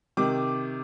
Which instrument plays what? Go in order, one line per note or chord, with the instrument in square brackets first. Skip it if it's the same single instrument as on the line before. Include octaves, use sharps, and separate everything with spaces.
[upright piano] C3 D#3 D6